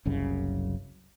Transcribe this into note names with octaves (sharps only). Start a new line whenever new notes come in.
F#1 C2 F#2 C#3